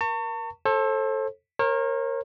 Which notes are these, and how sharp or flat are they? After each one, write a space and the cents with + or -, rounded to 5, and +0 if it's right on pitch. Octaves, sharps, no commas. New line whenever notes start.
A#4 +25 A5 +45 C#6 +0
A4 +0 C5 +40
A#4 +0 C#5 -40